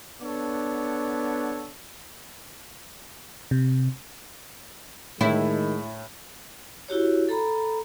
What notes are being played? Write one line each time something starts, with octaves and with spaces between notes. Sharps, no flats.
B3 D4 A4 C#5
C3
A2 D#3 G#3 E4
E4 F#4 G4 C#5
A4 A#5 B5